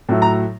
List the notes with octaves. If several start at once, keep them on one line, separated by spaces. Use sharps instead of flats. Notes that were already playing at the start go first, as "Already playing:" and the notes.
A2 F#3 A3
A#5